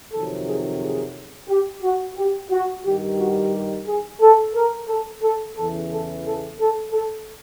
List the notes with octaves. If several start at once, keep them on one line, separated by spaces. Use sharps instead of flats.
F2 C3 D#3 F#3 A4
G#4
G#4
G4
F#4
G4
F#4
G2 D#3 G3 G4
F#4
G4
G#4
A4
A#4
A4
A4
E2 C#3 E3 A4
A4
A4
A4
A4